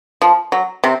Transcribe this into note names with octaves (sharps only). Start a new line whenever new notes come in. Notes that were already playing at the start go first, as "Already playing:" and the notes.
F3
F#3
C3 C4